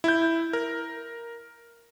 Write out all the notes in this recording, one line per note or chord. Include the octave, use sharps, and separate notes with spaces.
E4 G6
A#4